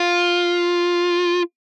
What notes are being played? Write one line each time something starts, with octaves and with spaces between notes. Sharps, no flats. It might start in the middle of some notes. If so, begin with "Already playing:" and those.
Already playing: F4